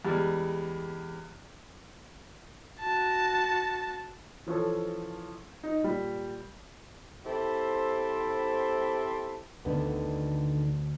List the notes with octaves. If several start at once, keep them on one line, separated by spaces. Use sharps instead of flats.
E2 G3 G#3
F#4 A5
E3 F3 C#4 A4
D#4
A#2 G3
C4 E4 G4 A4 C5
D2 D3 D#3 B3